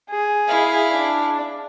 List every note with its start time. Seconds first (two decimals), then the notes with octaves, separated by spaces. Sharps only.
0.10 G#4
0.48 E4 F5
0.91 D4